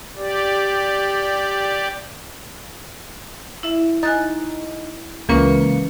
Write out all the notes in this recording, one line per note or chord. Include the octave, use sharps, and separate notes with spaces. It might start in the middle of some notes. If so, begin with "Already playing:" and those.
G4 D5
E4 E5
D#4 G#5 F#6 A6
C#2 E3 A#3 C#4 B4 C#7